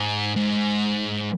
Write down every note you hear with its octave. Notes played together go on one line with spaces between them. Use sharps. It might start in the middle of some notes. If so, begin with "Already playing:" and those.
Already playing: G#2
G#2